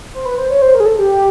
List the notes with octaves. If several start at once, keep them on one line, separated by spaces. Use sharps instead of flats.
C5
B4
C5
C#5
C5
A#4
G#4
A4
G4